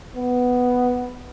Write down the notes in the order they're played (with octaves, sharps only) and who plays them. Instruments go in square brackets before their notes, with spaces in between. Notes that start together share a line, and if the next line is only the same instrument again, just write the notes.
[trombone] B3